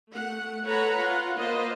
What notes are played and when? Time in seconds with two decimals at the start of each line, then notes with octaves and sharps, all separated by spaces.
0.11 A3 F#5
0.65 A4 B4 C#5 F#5 A#5 B5
0.97 F4 F#5
1.36 A#3 F4 B4 C5 D#5